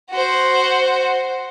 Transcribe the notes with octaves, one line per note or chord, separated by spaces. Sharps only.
F#4 C5